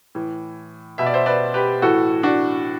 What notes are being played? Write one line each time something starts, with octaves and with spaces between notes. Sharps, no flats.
A2 E3
B2 E5
D5
C5 E5
B4 D5
G4 B4
A2 E3 F#4 A4
D4 F#4